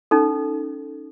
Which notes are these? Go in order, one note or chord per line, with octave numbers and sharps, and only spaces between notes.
C#4 D#4 A4